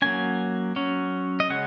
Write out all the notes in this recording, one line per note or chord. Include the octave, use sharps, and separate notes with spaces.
F#3 A#3 C#4 G#5
F#3 C#4
D#5
C#3 G#3 C#4 F#5